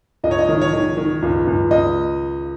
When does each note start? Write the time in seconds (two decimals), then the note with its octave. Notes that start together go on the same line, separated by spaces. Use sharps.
0.24 C#2 D#5
0.31 C#5
0.39 D#5
0.49 D#3
0.61 C#5
0.73 D#3
0.97 D#3
1.22 C#2
1.47 C#2
1.71 C#2 D#5